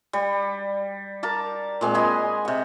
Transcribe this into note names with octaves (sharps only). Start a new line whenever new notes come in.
G3
A#4 A5 D6
A#2 G#3 C4
D#5 G#5 B5 C6
C3 F#5